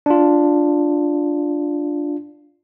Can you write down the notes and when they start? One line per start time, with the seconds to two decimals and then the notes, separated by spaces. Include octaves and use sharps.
0.06 D4 F4